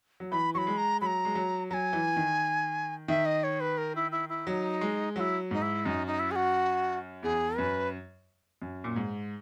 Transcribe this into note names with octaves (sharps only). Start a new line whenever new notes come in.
F#3
E3 B5
F#3 B5 C#6
G#3
A#5
F#3 A#5 B5
G#3
F#3
F#3 G#5 A#5
E3
D#3
D#3 E5
D#5
C#5
B4
A#4
E4
E4
E4
F#3 D#4
G#3
F#3 E4 F#4
G#2 D#4
E4
F#2 D#4
D#4
E4
G#4
F#4
E2 G#4
F#2 B4
F#2
A#2
G#2